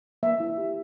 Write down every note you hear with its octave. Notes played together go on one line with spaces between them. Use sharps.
A#3 E5
E4
G4